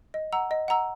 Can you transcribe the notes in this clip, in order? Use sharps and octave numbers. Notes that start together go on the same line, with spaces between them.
D#5
F#5 A#5 E6
D#5
F#5 A#5 E6